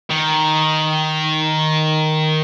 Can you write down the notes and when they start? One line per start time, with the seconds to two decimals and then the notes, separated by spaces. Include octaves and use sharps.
0.10 D#3